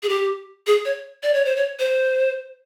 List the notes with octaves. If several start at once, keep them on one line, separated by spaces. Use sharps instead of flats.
G#4
G4
G#4
C#5
D5
C#5
C5
C#5
C5